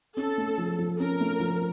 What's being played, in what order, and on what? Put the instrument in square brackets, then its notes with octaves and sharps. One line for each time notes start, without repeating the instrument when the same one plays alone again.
[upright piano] C#4 [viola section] A4
[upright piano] A3
F3
F3
[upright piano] C#4 [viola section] A#4
[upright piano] A3
F3